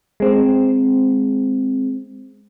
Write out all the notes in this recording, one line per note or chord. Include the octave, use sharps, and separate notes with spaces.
G#3 C4